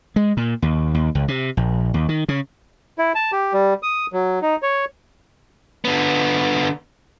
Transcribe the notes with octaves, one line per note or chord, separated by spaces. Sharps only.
G#3
A#2
D#2
D#2
C#2
C3
A#1
D#2
D#3
C#3
E4
A5
G4
G3
D#6
F#3
D#4
C#5
D3 B3